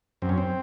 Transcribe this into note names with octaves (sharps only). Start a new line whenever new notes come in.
F#2 C4
C#4
C4